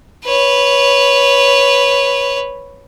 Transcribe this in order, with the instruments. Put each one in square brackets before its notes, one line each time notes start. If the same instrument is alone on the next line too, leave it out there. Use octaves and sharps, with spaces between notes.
[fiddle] B4 C#5